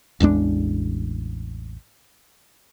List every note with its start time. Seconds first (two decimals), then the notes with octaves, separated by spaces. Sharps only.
0.20 A1 E2 G#3 D4